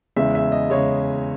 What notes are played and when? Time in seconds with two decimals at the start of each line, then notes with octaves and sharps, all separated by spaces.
0.16 E2 C#3 G#3 E5
0.35 E5
0.52 D#5
0.70 C#3 G#3 C#5